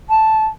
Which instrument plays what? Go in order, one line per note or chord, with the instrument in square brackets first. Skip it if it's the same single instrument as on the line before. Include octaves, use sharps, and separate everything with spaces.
[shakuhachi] A5